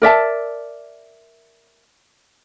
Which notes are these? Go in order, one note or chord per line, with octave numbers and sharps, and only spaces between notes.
A#4 D5 E5 A5